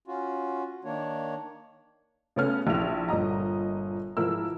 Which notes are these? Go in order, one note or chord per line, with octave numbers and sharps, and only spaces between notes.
C#4 F4 F#4
D#3 A#3 D4 C#5
C#3 A3 B3 C#4 F6
A#1 E4 E5 F7
G1 A#2 D#5 A#5
G#2 E3 F3 E4 A#4 E6